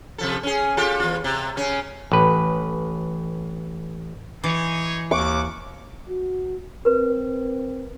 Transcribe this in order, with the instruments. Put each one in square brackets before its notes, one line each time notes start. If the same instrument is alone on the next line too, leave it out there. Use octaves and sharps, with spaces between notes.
[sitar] C3 F3 A4
C#4 G#4
F4 G4 A4
E2 F4
C3
C#3 C#4
[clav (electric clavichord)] A1 B4
[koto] E3 [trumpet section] D#4 G#4 C#5
[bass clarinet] D#2 [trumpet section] F#5 D6 [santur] C#6
[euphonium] F#4
[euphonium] C4 [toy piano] A#4 B4